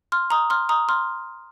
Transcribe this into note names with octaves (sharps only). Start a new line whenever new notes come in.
C6 F6
A#5 D#6
C6 F6
A#5 D#6
C6 F6